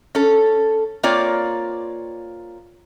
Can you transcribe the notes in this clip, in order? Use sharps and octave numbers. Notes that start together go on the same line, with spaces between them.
C#4 A4
A#3 C4 F4 C#5 D5